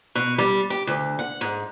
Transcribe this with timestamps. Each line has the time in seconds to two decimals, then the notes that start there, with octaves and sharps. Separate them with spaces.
0.15 B2
0.38 G3
0.70 G4
0.87 D2
1.19 F#5
1.41 G#2